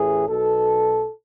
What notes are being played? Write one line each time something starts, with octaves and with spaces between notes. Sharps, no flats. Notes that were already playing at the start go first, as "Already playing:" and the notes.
Already playing: A1 A2 E3 G#4
B1 B2 A4